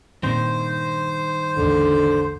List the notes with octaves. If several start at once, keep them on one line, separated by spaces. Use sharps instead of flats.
G2 A#2 D#3 C4 C5
A1 E2 D3